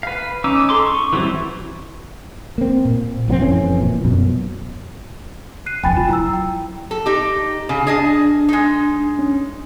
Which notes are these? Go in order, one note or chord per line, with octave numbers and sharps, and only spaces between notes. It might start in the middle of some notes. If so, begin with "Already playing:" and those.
B4 F5
C#4 D#4 D6 E6
A4 C6 D6
C#6
E3 F#3 G3 C4 E4
A#3 C4
A#2
A#1 F3 C4
F#1 F2 E3 C#4
A#2
F#2 B2
F#6 C7 D#7
E2 G2 G5 G#5 B5 A6
F4
F#3 E4 A#5 E6
G5
A4
D#4 G4
C#3
D4 G#4 D#5 A5
G#3 D#4
C#4